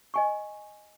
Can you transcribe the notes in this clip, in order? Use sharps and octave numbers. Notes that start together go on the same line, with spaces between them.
D#5 G#5 C#6